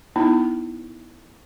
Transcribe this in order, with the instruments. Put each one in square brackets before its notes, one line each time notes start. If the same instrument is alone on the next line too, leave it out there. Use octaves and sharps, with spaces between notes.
[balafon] B3 D#4 E4